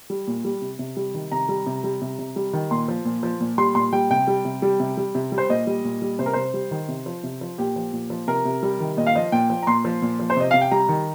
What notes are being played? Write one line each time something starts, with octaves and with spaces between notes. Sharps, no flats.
G3
A#2
G3
C3
C3
G3
D#3
C3 A#5
G3
C3
G3
C3
C3
G3
D#3
A#2 C6
F3
A#2
F3
A#2
G3 C6
A#2 C6
G3 G5
C3 G5
G3
C3
G3
C3
G3
C3
G3
C5
A#2 D#5
G3
A#2
G3
C3 C5
A#4
C3 C5
G3
D#3
C3
F3
C3
F3
A#2 G4
F3
A#2
F3
C3 A#4
C3
G3
D#3
A#2 D#5
F5
F3 D#5
A#2 G5
F3
A#5
A#2 C6
F3
A#2
F3
C5
C3 D#5
C3 F5
G5
G3 A#5
D#3